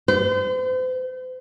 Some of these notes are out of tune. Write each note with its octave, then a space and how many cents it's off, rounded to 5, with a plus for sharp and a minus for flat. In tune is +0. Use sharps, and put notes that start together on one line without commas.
C5 -40